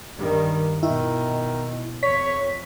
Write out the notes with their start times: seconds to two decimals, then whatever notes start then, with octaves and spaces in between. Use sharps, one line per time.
0.17 G2 D#3 G3
0.83 B2 D#3 E4
2.03 F2 C#5 B6